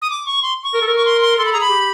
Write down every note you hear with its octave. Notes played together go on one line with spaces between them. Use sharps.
D#6
D6
C#6
C6
C#6
A#4
A4
A#4
C#6
C6
C6
A4 C6
B5
G#4 A#5
B5
G4